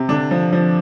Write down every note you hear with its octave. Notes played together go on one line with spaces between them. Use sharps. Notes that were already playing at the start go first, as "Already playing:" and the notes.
Already playing: C3
D3 D4
F3
F3